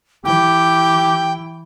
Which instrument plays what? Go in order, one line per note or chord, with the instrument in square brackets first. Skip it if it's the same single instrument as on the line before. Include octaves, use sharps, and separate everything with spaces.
[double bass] E3 [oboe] G4 [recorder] G5